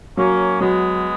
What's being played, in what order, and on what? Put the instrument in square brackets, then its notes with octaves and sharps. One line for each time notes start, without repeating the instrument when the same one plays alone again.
[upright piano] F#3 [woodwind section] A#3 C#4
[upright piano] F#3 [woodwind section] G#3 B3